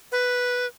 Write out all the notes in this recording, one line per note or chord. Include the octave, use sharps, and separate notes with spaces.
B4